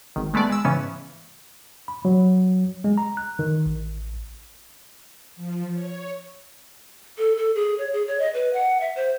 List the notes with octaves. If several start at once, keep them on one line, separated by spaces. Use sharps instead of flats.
G#1 D#3
G#3 A3 B3 D5
G#3 E6
G#2 C#3 E3 B3 C#4
B5
F#3
G#3
A#5
F#6
D#3
A1
F3
C#5
A4
A4
G#4
C#5
G#4
C#5
D#5
B4
F#5
E5
C5